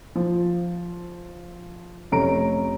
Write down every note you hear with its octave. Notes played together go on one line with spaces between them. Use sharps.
F3
F1 A3 C#4 A#5 D7